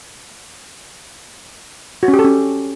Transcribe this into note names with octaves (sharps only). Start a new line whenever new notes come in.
F#4
C#4
G4
A4
C#4